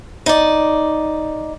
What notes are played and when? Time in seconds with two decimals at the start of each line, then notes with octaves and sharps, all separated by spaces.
0.26 D#4 D5